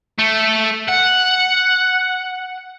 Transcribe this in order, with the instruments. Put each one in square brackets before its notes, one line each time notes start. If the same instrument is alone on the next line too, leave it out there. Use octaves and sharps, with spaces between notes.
[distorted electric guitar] A3
F#5